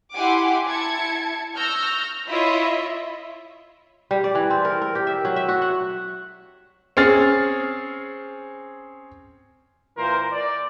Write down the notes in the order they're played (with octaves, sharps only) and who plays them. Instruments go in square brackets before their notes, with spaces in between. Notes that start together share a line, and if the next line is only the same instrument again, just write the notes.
[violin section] E4 G4 F#5 G#5 C6 D6
E4 A5 G#6 C#7
C#6 E6 F6 G6 A#6
E4 F4 C#5 D#5 E5 B5
[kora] G3
D5
E3
C4
A#4
A#4
G4
E5
F#3
E5
F#4
F#5
[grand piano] C4 C#4 G#4 F6 A6
[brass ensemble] A#2 E3 A#4 C5
D5